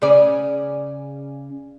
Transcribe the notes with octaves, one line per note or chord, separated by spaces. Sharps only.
C#3 C#4 D5